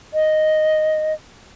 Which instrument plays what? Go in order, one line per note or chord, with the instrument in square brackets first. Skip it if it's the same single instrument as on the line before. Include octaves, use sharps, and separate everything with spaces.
[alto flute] D#5